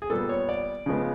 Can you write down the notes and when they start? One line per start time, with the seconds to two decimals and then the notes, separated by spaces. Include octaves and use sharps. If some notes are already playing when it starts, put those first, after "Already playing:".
0.02 G#4
0.10 A#2 G3 B3 A4
0.29 C#5
0.49 D5
0.86 C#3 F3 G#3 B3